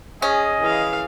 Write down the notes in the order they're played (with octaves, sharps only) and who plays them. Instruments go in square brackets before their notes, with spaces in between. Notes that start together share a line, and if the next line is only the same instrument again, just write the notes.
[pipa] C#4 [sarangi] G#4 [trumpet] D#5
[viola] E3 F5 [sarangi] G#4